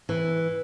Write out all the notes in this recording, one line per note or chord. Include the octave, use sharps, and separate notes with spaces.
E3